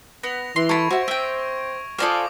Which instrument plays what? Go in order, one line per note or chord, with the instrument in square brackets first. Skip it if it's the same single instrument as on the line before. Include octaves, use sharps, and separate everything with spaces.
[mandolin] B3 [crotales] A#6 F7
[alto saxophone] E3 [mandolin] C6
[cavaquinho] A4 B5 [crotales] C#6 G#6 D7
[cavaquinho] F#4 E5 [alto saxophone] C5
[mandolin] C4 G5 [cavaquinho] E5
[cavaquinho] F4 C5 F5 [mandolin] A4 D5 G#5 [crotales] D6 D#6